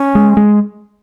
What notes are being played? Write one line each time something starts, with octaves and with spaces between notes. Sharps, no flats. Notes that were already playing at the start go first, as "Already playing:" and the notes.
Already playing: C#4
G#3
G#3